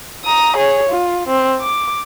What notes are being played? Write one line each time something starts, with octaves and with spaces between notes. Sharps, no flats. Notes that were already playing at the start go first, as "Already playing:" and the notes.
A#5 D#6
G#4 C#5
F4
C4
D6